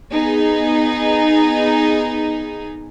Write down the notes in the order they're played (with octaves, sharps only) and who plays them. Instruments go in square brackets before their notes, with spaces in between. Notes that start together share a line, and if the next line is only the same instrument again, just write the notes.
[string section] B3 D#4 G#4